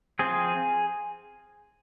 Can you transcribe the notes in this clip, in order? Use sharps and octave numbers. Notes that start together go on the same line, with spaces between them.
F3 C4 G#4